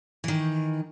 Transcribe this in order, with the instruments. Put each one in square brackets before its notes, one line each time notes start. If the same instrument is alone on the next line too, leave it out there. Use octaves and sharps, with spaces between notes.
[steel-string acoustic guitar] D#3 E3